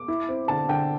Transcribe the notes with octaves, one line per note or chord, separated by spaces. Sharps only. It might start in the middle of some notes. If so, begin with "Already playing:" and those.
Already playing: D6
E4
C4
D3 A5
D3 G5